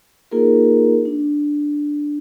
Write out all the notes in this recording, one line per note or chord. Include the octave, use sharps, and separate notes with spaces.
A#3 D#4 F4 G#4 A#4
D4